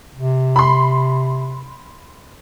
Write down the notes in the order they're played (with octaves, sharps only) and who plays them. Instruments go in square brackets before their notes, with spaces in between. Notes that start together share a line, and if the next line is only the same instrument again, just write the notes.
[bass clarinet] C3
[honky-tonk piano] B5 C6